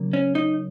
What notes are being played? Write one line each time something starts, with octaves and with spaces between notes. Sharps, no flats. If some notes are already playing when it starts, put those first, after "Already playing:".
Already playing: C#3 F#3 A#3
C#4
D#4